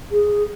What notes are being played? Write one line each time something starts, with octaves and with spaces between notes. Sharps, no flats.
G#4